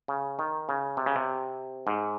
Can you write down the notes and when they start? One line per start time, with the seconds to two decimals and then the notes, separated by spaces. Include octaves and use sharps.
0.08 C#3
0.39 D#3
0.69 C#3
0.97 C3
1.06 C#3
1.16 C3
1.87 G#2